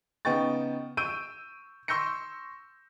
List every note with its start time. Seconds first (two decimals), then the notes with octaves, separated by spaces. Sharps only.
0.25 C#3 B3 D#4 G5 C#6 A6
0.97 C#6 E6 G6 D7 D#7
1.88 C6 C#6 E6 G6 A#6 C#7